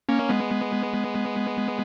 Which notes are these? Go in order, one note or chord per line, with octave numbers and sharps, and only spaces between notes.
A#3 C#4
G#3 B3